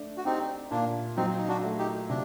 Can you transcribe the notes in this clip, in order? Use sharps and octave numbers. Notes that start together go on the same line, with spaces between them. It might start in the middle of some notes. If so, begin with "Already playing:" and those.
Already playing: A3 D4
F#4
C4 D#4 G4
A#2 A#3 D4
F#3 C4 D#4
D#4
D4 F#4
A3
D#4 G4
C3 D4